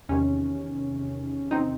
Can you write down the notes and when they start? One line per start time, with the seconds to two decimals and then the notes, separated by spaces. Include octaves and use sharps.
0.09 E2 C3 D#3 C#4
1.51 C4 D#4